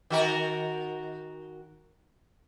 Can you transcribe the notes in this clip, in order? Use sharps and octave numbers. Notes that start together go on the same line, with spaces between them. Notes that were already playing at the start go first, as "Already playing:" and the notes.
D#3 F#4 A#4